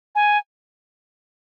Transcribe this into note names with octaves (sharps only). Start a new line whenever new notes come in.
G#5